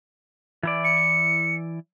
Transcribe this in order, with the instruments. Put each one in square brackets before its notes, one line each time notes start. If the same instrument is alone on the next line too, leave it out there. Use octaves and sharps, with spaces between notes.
[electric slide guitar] E3 E4 D5
[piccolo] C#7